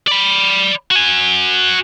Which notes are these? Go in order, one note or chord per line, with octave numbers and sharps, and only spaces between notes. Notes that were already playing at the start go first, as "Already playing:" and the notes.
D5 B5
F#4 G#5